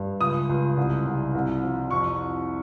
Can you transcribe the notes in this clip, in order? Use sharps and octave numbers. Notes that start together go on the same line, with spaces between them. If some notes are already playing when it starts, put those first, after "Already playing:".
Already playing: G2
C#2 D#6
C#2
C2
C2
C2
F3
F2 C#6